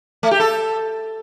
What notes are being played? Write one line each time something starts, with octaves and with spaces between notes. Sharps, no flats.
A3
G4
A4